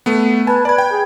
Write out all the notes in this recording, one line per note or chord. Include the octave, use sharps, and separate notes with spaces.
A3 B3
B4 G#5 A5
B4 D5 G#6
G5
G#4